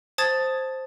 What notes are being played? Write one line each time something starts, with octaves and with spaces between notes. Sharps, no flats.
C5 A5 D#6 G#6 A6